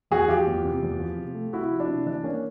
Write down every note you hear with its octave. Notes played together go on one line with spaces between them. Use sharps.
E2 F#4 G#4
F3 F4 G4
E2
C3
E2
F3
C3
A3
C3 E4 F#4
F3
D4 E4
C3
E3 D4
A#3 C#4